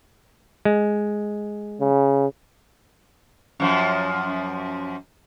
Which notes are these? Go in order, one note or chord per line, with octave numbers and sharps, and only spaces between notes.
G#3
C#3
F#2 F3